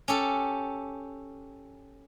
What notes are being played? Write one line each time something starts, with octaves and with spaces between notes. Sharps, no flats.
C#4 G4 A4